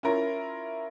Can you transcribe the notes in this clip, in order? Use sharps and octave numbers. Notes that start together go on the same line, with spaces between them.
C#4 E4 F4 A#4 A#5